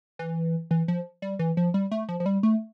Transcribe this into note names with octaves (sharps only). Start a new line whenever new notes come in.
E3
E3
F3
G3
E3
F3
G3
A3
F3
F3
G3
A3